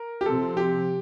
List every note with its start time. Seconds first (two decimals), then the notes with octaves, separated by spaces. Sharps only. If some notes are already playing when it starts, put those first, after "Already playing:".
Already playing: A#4
0.21 G4
0.26 C3 F3 C4 A4
0.57 G4